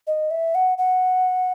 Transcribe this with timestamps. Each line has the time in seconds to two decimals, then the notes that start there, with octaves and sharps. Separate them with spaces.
0.07 D#5
0.31 E5
0.55 F#5
0.78 F#5